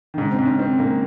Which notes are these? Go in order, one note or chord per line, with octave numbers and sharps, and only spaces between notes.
D#3
G#2 C#3
C4
G#2
C#4
D#3 C4
G#2 A#3